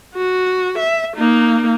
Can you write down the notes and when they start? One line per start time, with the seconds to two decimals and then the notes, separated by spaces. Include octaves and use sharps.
0.15 F#4
0.78 E5
1.16 A#3 D#4